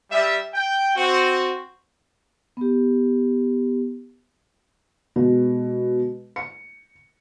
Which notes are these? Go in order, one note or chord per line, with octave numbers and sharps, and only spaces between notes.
G3 E5
G5
C4 F#4
B3 G4
B2 G#3
C#7